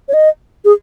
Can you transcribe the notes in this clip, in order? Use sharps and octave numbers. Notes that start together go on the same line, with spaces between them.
C#5
D#5
G#4